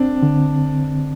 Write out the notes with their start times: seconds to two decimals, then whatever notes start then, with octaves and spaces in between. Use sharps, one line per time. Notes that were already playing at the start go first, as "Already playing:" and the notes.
Already playing: C4 D4
0.23 D3